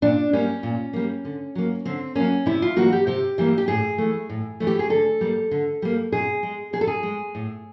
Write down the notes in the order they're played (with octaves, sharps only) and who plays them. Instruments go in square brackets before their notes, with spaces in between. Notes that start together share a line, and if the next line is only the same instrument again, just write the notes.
[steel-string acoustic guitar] A#2 D4
G3 A#3 C#4
A#2
G3 A#3
D3
F#3 A#3
D3 C4
F#3 A#3 C#4
C3 E4
F4
E3 G3 A#3 F#4
G4
C3 G4
E3 G3 A#3
G4
A2 G#4
E3 A3
A2
E3 A3
G4
G#4
D3 A4
G3 A#3
D3
G3 A#3
B2 G#4
G#3
B2 G#4
A4
G#4
G#3
A2